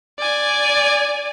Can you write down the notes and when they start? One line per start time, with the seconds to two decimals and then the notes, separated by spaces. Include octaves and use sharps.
0.19 D5 G#5